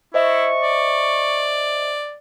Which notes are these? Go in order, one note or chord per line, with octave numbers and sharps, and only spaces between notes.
E4 C5 D#5 E5 C#6
D5